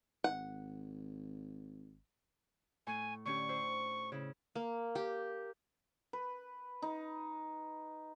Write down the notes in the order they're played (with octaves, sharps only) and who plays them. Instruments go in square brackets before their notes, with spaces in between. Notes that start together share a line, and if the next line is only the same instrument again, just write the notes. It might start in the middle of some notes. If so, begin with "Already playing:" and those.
[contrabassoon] G#1 [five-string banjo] F#5
[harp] A2 C#6 [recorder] G#5
[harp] D3 C#4 G4 [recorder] C#6
[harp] E4 C5
C#3 E4
[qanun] A#3
G4
[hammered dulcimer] B4
D#4